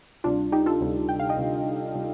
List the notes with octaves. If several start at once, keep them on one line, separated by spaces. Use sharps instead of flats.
D2 C3 G3 D4 F4
D#4 G4
F4 A4
D2 C3 G3
G5
F5
D#5 G5
D2 C3 G3
C3 G3